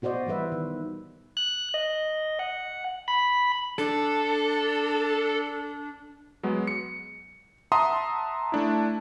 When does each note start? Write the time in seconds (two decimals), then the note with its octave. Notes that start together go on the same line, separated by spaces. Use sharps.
0.02 B2 F#4 C5 D5 D#5
0.26 E3 G3 B3 B4 E5
0.52 D#3
1.37 F#6
1.74 D#5
2.39 F#5
3.08 B5
3.78 D4 A4
6.43 F#3 G#3 B3
6.67 C#7
7.72 E5 F#5 A5 A#5 C6 D#6
8.52 A3 D4 E4